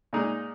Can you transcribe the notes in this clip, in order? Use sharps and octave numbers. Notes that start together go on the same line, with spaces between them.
A#2 G#3 D#4